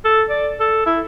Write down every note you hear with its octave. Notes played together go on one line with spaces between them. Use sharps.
A4
D5
A4
E4